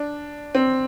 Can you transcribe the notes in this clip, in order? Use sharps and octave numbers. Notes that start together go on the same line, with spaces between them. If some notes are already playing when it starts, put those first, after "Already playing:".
Already playing: D4
C4